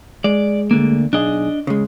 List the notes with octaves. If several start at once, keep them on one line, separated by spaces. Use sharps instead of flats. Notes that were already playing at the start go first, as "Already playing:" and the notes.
G#3 D5
D2 D3 A#3
B1 D4 G#4 D#5
C#3 G#3